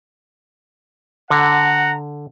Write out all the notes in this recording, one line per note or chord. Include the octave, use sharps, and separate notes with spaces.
D3 F#5 A#5